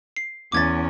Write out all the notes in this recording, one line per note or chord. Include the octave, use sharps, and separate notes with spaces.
C7
E2 C#4 D6 G#6 A6